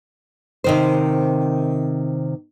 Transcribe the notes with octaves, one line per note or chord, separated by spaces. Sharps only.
C3 D#3 C5